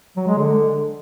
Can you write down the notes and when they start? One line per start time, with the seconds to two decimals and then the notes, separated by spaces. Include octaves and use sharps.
0.17 F#3
0.27 G#3
0.38 D3